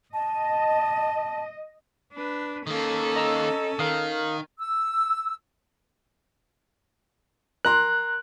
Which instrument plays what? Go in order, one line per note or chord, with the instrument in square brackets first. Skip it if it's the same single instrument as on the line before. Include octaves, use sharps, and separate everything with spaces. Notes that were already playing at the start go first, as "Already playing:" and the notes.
[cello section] D#5 [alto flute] A5
[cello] D4 B4
[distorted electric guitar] D#3 A#3 [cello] C#4 A4
[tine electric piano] D#5 A#5 E6
[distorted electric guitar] D#3 [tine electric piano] A#4 F5 D#6
[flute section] E6
[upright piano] A#4 A#5 C6 [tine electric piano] F#6